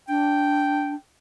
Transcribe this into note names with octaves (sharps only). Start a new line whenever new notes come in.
D4 G5